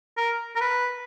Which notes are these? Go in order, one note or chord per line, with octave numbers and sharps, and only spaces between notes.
A#4
A#4
B4